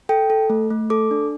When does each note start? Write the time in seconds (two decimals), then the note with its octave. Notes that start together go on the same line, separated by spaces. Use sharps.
0.09 A4 G5
0.30 A4
0.50 A3
0.70 A3
0.90 A4 D6
1.11 D4